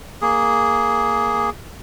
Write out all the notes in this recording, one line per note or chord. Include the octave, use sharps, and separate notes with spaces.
A#3 G#4